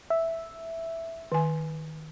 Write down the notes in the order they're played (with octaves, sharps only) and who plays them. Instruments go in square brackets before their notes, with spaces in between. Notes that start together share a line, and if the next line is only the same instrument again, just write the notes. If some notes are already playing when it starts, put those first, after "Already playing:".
[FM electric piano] E5
[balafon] D#3 G#5